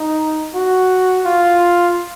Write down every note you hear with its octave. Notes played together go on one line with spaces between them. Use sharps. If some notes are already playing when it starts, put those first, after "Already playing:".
Already playing: D#4
F#4
F4